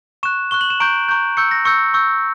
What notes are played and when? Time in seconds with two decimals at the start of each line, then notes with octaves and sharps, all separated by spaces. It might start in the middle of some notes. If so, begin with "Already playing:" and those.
0.23 C#6 F#6 E7
0.51 C#6 F#6 G7
0.61 F#7
0.70 E7
0.80 A#5 C#6 G6 D7
1.09 A#5 C#6 G6
1.37 C#6 E6 G6 C#7
1.51 A#6
1.65 C#6 E6 G6 C#7
1.94 C#6 E6 G6